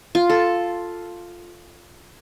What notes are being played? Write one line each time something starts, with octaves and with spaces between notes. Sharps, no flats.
F4
A4